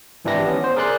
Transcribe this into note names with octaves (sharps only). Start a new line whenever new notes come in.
G#1 E3 D4 E4 G4 A#6
B3 C#4
C5
G#4 A#4 D5 C6 F#6